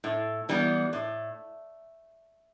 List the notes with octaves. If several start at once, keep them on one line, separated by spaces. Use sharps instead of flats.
A2
E3 G3 B3
A2